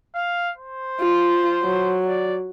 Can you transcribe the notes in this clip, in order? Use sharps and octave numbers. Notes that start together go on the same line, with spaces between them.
F5
C5
F4
F#3
D5